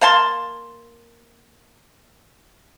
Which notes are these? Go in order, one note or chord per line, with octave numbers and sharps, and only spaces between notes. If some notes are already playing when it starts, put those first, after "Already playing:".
A#3 F5 A5 C6